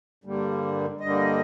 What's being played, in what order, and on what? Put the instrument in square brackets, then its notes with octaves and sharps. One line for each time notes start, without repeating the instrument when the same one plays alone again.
[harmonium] G2 D3 G3 A#3
G2 D3 G3 A#3 D#5